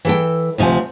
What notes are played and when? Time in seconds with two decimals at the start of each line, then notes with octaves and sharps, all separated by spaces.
0.05 E3 A4 G5
0.58 D2 C3 F3 G#5